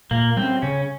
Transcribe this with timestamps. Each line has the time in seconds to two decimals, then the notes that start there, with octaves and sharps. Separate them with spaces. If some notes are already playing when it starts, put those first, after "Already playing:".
0.11 A#2 A#3
0.37 G3 C4 C#4
0.62 C#3 C#4